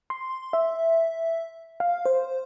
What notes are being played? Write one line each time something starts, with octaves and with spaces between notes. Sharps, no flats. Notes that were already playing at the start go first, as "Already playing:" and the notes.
C6
E5
F5
C5